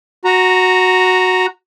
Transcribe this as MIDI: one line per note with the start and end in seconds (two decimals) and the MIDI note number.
0.25 1.46 66
0.25 1.46 82